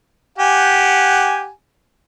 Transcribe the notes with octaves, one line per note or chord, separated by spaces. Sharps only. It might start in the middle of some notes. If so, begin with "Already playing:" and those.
G4 F#5 G#5